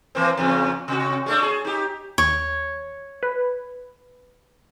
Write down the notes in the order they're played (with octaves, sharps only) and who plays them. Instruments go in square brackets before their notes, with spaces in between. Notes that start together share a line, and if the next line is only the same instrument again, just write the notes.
[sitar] E3 A#3 C4
E2 G#2 C#3
C3 F#4
G#3 A3 D4
G#4
D#4 G4
[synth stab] D#2 [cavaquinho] C#5
[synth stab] B4